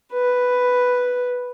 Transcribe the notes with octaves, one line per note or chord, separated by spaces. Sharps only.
B4